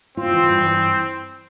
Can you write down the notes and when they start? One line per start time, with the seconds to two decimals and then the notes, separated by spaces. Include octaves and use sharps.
0.17 C4 F4
0.33 E3
0.48 G2
0.64 E3